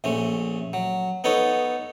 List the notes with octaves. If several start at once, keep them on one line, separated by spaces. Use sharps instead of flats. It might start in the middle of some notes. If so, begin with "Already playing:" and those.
A#1 A3 C#4
F#3
B3 D#4 A4 C#5